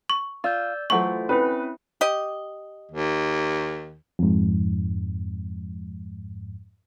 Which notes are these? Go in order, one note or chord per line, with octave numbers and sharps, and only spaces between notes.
C#6
F4 D5 E6 G6
E3 F#3 A3 F4 A4 C5 C#6
C4 C#4 E4 B4
G4 D#5
D#2
F2 G#2